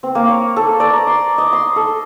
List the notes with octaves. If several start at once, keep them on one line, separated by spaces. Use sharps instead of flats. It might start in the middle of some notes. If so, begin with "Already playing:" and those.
C4
A#3
C#5
A4
D5
A#5
C6
D#5
C6
A4